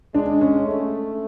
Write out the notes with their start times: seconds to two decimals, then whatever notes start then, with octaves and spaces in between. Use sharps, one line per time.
0.15 G#3 D4
0.41 C#4
0.67 A3